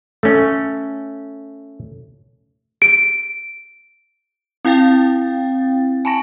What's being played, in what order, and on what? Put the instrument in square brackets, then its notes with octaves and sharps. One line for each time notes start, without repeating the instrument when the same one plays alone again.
[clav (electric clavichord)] A3 C#4
[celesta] D7
[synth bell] C4 E4 F5 G5 A6
G#5 A5 B5 C#6 A#6